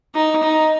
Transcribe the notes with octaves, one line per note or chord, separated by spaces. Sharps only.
D#4
D#4